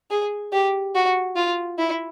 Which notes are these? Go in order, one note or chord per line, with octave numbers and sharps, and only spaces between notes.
G#4
G4
F#4
F4
E4